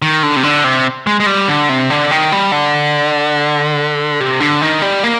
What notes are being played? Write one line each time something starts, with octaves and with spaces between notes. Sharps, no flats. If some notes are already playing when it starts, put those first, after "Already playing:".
D#3
D3
C3
D3
C3
G#3
G#3
G3
D3
C3
D3
D#3
G3
D3
C3
D3
D#3
G3
A#3